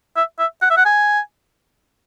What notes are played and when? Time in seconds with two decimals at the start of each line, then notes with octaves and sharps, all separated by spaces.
0.16 E5
0.39 E5
0.62 F#5
0.70 E5
0.77 F#5
0.85 G#5